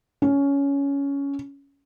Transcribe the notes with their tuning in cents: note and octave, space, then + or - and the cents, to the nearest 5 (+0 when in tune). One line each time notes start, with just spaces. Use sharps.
C#4 +15